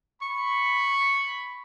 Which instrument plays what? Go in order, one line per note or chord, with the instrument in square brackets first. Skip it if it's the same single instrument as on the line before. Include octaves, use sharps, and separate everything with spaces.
[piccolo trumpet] B5 [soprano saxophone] C#6